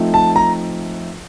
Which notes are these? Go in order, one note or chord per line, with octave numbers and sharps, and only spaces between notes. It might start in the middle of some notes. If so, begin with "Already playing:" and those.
Already playing: F3 A3 C4 D#4
A5
A#5